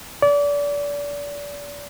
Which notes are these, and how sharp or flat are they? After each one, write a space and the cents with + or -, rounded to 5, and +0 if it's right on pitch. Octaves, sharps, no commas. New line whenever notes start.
D5 -30